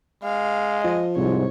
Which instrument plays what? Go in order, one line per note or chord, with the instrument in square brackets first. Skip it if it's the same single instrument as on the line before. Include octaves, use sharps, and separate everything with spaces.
[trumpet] G#3 [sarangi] F5
[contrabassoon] F3 [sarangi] D#5
[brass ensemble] C2 G#2 C5 [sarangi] C#5